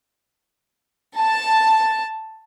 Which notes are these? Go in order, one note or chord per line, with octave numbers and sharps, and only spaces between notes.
A5